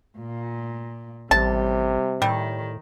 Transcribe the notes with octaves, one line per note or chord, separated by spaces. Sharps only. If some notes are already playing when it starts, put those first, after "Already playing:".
A#2
A1 C3 G3 A5
A2 D#3 G3